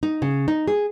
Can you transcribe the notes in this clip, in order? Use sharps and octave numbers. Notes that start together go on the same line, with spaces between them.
D#4
C#3
D#4
G#4